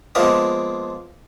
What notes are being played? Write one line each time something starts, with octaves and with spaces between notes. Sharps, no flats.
F3 G#3 A#3 B3 A#4 E5